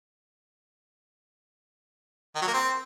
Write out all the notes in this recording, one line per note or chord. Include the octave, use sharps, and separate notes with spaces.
D#3
F#3
A#3
C4